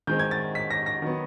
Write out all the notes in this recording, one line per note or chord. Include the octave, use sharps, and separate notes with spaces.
D#3 G#3 C4 G6
G#6
A6
B6
A#6
A#6
D#3 F#3 B3